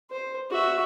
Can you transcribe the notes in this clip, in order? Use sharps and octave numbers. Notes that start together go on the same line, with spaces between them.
C5
F#4 E5